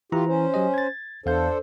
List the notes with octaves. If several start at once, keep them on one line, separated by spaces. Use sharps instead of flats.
E3 E4 F4 G4 A#5
C#4 C5
F#3 G4 D#5
G#6 A6
E2 D4 A4 C5 F5 G6